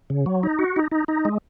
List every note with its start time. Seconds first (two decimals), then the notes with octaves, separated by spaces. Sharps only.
0.10 C#3
0.26 F#3
0.43 D#4
0.59 F#4
0.76 D#4
0.92 D#4
1.08 D#4
1.25 G#3